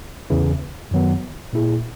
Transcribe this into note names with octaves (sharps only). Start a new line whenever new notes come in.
E2 C#3 E3
F#2 D#3 F#3 B3
A#2 A#3 E4 G#4